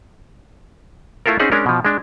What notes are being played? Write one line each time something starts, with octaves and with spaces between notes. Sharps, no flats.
A3 E4 F4 A4 A#4
C4 C#4 D#4 G#4 C5 F#5
G#3 C#4 D4 A#4
B2 F3
G#3 D4